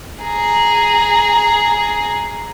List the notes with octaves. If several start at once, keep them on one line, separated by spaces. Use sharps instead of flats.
G#4 A#5